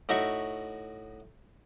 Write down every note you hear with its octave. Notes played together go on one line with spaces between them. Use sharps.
A2 D#4 F#4 E5 C#6